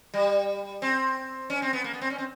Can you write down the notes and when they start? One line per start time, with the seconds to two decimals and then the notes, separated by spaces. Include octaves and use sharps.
0.14 G3
0.82 C4
1.50 C#4
1.62 C4
1.73 B3
1.84 A#3
1.93 B3
2.01 C4
2.10 C#4
2.18 C4